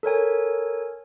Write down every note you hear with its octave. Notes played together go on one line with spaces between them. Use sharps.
A4 A#4 C#5 G#5